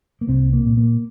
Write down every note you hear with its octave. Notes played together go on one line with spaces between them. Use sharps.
A#3
C2 C4
A#3
A#2
A#3